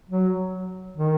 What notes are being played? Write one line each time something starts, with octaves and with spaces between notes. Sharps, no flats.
F#3
D#3